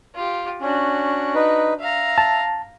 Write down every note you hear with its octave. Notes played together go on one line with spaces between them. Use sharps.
F4 G4
C#4 D4 F#4
D#4 B4
E5 F5 A#5
A5